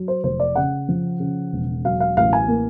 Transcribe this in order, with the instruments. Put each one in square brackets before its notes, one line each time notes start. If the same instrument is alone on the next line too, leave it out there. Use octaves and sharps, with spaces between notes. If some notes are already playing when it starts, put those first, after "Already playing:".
Already playing: [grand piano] F#3
C5
F1 C5
D5
C#3 F#5
F3
C#3
E1
F#3 F5
F5
A1 F5
G#5
A#3